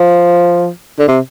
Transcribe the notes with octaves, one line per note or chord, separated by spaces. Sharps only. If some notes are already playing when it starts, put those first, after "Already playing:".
Already playing: F3
D3
C3